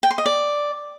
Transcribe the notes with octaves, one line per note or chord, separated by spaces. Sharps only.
G5
C6
D#5
D5